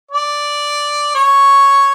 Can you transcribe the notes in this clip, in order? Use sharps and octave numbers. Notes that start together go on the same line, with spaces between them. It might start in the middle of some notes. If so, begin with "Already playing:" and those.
D5
C#5